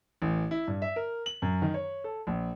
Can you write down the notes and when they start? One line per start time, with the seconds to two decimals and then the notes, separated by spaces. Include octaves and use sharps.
0.22 A1
0.51 E4
0.68 G2
0.82 E5
0.96 A#4
1.26 F#7
1.42 F#2
1.62 D#3
1.74 C#5
2.04 A4
2.27 A#1